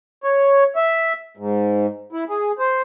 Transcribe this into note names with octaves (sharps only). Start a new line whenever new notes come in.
C#5
E5
G#2
E4
G#4
C5